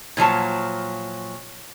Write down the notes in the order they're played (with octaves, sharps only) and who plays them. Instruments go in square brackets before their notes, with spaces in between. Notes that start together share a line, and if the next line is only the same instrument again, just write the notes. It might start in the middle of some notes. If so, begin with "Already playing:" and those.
[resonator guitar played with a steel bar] A#2 F3 F#3 A5